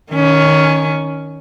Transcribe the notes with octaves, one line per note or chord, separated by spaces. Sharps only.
D#3 C#4